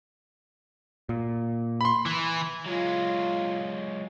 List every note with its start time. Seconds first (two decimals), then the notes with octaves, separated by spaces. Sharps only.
1.09 A#2
1.81 B5 C6
2.06 E3
2.66 F#3 G#3 F4